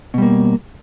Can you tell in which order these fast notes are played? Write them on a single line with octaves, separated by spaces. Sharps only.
B2 G3 A#3